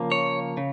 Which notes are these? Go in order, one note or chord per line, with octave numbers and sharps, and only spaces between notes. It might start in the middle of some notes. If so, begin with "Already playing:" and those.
Already playing: C#3 F3 A#3
C#5
C#3